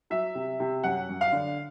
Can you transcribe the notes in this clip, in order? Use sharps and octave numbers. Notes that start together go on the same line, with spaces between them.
F#3 E5
C3
C3
F#2 F#5
F#2
F5
D3